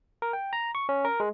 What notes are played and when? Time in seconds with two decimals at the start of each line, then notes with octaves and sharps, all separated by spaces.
0.22 A#4
0.33 G5
0.53 A#5
0.75 C#6
0.89 C#4
1.05 A#4
1.20 G#3